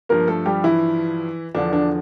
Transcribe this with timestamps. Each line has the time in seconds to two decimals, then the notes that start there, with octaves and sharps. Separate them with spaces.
0.09 G2 F3 A#3 A#4
0.27 A3 A4
0.46 G3 G4
0.64 E3 E4
1.55 E2 D3 F3 D4
1.73 D4